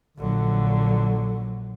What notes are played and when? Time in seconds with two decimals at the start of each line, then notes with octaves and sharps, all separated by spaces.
0.18 A#1 D3 F#3